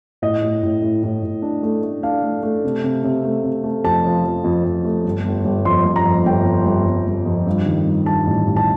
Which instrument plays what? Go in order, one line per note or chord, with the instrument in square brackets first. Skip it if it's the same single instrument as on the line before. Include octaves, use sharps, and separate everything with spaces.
[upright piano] A2 D#5
A2
A2
A2
A2
A2
D4
A3
A3
D4 F5
A3
A3
C3
C3
C3
A3
C3
A3
F2 A5
F3
F3
F2
F2
A3
G1
G1
G1
F2 C6
G1
A#5
F2
G1 G5
F2
G1
G1
G1
F2
G2
D#3
G2
G2 A5
A1
A1
A5